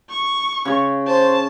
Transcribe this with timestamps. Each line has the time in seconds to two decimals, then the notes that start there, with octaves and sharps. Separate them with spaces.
0.10 C#6
0.65 C#3 C#5
1.07 C5 A5